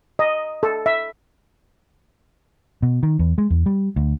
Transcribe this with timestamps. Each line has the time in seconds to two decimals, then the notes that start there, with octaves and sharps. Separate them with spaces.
0.19 D#5
0.63 A4
0.86 E5
2.82 B2
3.03 D#3
3.19 E2
3.38 G#3
3.50 E2
3.66 G3
3.96 D2